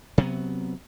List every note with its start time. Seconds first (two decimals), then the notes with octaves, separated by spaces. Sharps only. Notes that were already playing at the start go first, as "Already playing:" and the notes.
0.18 C3 F#3 B3